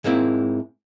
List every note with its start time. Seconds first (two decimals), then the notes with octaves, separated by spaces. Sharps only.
0.04 G#2 G#3 A#3 C4 E4